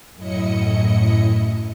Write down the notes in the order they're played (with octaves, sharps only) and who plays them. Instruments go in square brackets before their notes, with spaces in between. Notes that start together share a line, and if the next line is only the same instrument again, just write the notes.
[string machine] F#2 A2 E4 D#5 C#7